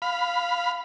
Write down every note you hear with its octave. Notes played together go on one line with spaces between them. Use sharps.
F5 B5